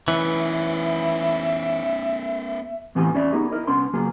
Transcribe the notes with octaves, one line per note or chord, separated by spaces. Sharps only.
E3 B3 C#4 E5
A2 E3 B3 C4 G4 G#5
E2 C#4 D5 E5
B3 D#4 G4 G#4 A#4
E4 A#4 D#5
C2 B3 C#4 D4 C6
C#2 F#3 A#3 B3 G#4